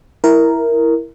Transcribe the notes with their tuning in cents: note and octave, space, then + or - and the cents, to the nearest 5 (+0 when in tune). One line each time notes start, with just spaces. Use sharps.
E4 +0 A#4 +0